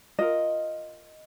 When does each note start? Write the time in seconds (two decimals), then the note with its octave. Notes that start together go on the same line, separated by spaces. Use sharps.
0.19 F4 A#4 D#5